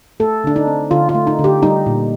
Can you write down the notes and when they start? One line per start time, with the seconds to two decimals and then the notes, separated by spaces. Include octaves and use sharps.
0.20 A3 A4
0.44 D3 D4
0.56 D#4
0.67 C4
0.91 D3 F4
1.09 F4
1.15 A3
1.27 D#4
1.39 D3
1.44 G4
1.63 G3 D#4
1.86 A#2